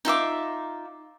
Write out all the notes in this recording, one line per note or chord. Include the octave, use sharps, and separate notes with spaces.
D#4 F4 E5 D6